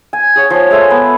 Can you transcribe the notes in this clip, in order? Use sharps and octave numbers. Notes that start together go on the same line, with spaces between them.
G#5
G#4 C#5 F#5
F3 G#5
G#3 A3 E5 G#5
B3